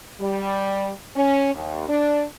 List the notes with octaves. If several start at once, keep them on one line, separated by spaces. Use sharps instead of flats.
G3
C#4
D#2
D4